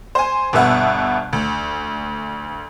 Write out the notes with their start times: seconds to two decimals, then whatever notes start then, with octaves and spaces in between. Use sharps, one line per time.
0.15 C5 G#5
0.53 G1 B2 B3 E5 F#5
1.33 D2